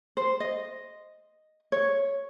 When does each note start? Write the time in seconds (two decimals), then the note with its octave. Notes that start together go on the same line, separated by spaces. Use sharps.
0.17 C5
0.40 D#5
1.72 C#5